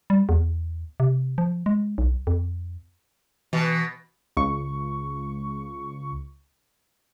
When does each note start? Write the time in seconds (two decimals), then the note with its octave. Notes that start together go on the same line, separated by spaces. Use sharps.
0.10 G3
0.29 E2
1.00 C3
1.38 F3
1.66 G#3
1.98 B1
2.27 F2
3.53 B2 E3
4.37 C#2 C#6